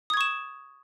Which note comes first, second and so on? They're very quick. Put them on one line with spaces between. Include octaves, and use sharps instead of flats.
D#6 G#6 C#6 E7